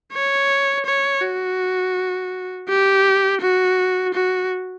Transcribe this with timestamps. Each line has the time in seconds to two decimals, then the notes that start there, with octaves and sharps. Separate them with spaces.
0.13 C#5
0.86 C#5
1.22 F#4
2.69 G4
3.41 F#4
4.14 F#4